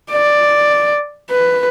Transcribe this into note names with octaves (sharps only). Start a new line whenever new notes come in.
D5
B4